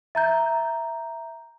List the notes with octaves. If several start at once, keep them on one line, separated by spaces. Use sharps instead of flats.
E5 A#5 G6